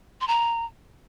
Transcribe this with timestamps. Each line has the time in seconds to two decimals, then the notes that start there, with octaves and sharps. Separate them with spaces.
0.21 C6
0.28 A#5